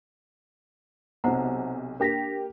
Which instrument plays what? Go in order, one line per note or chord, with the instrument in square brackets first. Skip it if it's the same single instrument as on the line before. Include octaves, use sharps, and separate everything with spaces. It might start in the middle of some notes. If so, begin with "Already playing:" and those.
[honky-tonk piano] B1 C3 [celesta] C5 F#5 A#5
[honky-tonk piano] A#3 G4 [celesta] D4 A#6 B6